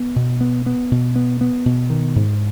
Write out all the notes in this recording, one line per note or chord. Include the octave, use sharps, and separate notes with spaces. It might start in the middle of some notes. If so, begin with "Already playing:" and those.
Already playing: B3
B2
B3
B3
B2
B3
B3
B2
D#3
G#2